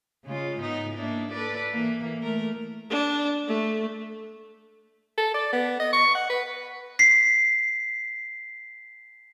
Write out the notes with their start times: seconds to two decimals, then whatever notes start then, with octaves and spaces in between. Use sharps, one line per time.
0.24 C#3 G#3 F4
0.61 G#2 B3 D#4
0.95 A#3 D4 E4
1.32 A4 B4 D5
1.72 E3 A#3
2.22 A3 A#4
2.90 D4
3.48 A3
5.18 A4
5.34 D5
5.53 B3
5.80 D#5
5.93 C#6
6.15 F#5
6.30 B4
6.99 B6 C7